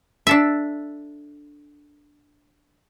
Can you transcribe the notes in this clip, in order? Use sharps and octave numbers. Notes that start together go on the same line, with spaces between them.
D4 A4 E5